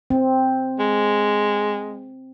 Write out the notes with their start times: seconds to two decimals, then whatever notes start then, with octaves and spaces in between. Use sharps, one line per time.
0.10 C4
0.79 G#3